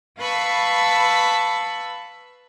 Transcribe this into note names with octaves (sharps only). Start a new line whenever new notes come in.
B4 F5 A5 B5 C#6 E6